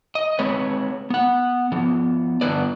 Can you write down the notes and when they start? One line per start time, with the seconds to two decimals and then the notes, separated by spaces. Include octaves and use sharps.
0.15 D#5
0.39 G#3 C4 B4 C#5
1.10 B3 F#5
1.72 F3 B3
2.41 G2 D3 B3 B4 D5